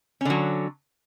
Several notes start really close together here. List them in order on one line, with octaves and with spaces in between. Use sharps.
C#4 D3 F#3